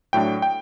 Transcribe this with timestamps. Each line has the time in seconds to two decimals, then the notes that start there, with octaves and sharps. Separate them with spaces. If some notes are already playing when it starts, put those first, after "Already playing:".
0.13 A2 F#3 A3 D4 G5
0.42 G5